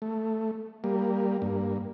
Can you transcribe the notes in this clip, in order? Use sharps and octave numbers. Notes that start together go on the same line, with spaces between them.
A3
G3 A#3
G2 A#3